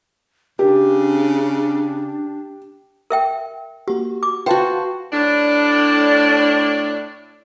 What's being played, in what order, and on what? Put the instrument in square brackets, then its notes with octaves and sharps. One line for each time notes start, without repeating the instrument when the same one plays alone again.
[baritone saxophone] C#3 [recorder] D4 [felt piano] G4
[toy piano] A#4 E5 G5
[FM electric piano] A#3 F#4 [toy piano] G4
[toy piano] D6
[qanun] F#4 C5 [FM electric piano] B4 F5 A5 [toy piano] G5
[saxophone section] A2 D4